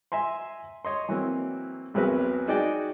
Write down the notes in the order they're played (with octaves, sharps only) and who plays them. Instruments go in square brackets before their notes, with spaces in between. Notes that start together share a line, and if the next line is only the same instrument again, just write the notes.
[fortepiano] E5 G#5 A#5 C6
C#5 D#5 C6
E3 F#3 A#3 C4
B1 E2 F#3 C4 A#4 B4
D#4 F#4 G#4 D5 D#5 G5